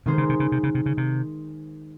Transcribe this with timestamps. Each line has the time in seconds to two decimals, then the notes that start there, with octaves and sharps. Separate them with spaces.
0.06 C3 D#3 G#3 D#4 G#4 C5
0.18 C#3
0.29 C3
0.40 C#3
0.52 C3
0.63 C#3
0.75 C3
0.86 C#3
0.97 C3